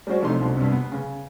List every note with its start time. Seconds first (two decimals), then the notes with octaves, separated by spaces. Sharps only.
0.07 G3 G#3 C#4 F#4 C5 D5
0.21 C3 F3 A3 D4 D#4 C6
0.40 C2 B2 D3
0.56 G2 C3
0.72 B3
0.92 C#3